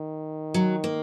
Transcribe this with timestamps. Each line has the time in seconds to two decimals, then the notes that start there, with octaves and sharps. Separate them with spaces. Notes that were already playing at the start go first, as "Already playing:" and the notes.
Already playing: D#3
0.54 F#3
0.84 A#3